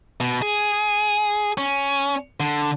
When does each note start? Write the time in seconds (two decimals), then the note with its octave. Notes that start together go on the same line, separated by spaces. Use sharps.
0.20 B2
0.42 G#4
1.58 C#4
2.40 D3